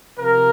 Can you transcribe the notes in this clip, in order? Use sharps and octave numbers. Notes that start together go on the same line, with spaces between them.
C3 F3 A#3 A#4